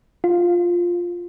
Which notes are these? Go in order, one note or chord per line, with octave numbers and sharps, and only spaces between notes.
F4